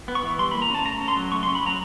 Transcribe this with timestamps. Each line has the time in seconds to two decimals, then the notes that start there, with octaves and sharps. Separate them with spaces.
0.08 B3
0.15 C#6
0.23 E3
0.39 G3 C6
0.51 A#3 B5
0.62 A#5
0.70 C#4 A5
0.85 A3 A#5
1.01 C#4
1.08 C6
1.16 F#3
1.32 A3 C#6
1.43 C6
1.47 C#4
1.55 B5
1.63 F#3 A#5